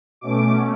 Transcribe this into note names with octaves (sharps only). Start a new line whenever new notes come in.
B2 A3 C#4 D6